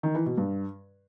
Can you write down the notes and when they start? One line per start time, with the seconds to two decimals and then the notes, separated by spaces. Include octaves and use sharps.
0.03 D#3
0.15 E3
0.26 B2
0.37 G2